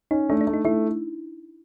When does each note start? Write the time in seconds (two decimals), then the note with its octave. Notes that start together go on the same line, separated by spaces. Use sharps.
0.11 C#4 D#4
0.30 A3 D4
0.41 D4
0.47 A3
0.54 D#4
0.65 A3 E4